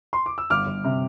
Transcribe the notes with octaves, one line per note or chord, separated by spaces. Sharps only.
C6
D6
E6
G1 D6 F6
G1
C3